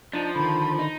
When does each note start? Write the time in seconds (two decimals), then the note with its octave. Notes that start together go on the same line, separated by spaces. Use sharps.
0.13 F3 D4 D#4
0.35 D3 D#3 B5
0.79 D#4